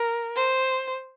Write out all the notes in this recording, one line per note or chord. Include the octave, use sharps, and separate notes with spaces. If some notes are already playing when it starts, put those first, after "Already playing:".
Already playing: A#4
C5